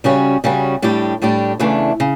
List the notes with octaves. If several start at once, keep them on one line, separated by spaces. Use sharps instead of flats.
C#3 G3 C#4 F#4
C#3 G3 C#4 F#4
A2 G3 D4 G4
A2 G3 D4 G4
E2 C#3 E3 A3 D4
C#3